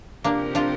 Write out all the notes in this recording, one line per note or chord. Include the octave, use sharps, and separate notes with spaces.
C3 F3 A#3 C4 D4 G4 A#4
D4 F4